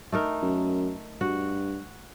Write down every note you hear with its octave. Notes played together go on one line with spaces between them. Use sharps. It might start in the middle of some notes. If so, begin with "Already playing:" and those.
A3 D#4 A#4
F#2
G2 F#4